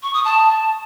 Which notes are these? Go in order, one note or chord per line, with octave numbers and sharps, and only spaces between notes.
C#6
D#6
A5